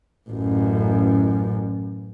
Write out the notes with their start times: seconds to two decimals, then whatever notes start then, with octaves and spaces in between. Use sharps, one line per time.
0.29 A1 F#2